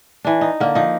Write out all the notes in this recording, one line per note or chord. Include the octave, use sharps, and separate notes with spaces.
E3 D4
D#4
D3 A#3
F3 D#4